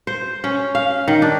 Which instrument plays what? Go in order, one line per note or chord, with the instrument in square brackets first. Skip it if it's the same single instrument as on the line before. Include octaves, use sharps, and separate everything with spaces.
[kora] C5
C#4
F5
D#3
D4